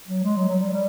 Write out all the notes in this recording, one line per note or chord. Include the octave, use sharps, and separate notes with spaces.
F#3
G#3
F#3
F#3
G3
G3